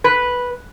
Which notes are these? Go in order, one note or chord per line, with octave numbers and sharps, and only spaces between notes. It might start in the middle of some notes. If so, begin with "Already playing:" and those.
B4